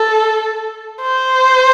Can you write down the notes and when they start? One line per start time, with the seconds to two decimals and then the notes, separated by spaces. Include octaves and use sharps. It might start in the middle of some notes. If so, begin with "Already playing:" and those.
Already playing: A4
1.01 C5